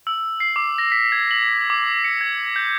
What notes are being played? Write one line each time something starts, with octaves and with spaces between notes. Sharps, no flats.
E6
C7
D6
A#6
B6
G#6
F#7
D6
C#7
G#6
G6